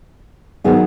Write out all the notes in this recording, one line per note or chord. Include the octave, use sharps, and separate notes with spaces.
D#3 F#3 B3 D#4 G#4